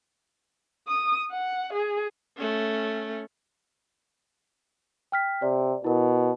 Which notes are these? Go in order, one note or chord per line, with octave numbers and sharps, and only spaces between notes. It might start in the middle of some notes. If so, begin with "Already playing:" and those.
D#6
F#5
G#4
A3 C#4
G5 F6 B6
C3 D5
B2 E4 A#4